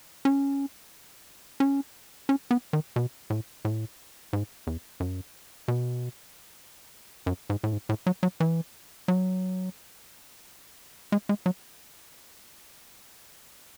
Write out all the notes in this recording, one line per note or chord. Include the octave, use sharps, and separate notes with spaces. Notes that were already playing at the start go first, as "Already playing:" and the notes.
C#4
C#4
C#4
B3
D#3
B2
A2
A2
G#2
E2
F#2
B2
F#2
G#2
A2
G#2
A2
F#3
F#3
E3
F#3
G#3
G#3
F#3